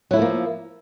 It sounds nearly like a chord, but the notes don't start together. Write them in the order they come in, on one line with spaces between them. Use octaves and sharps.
F#3 E4 A3 F3 A#3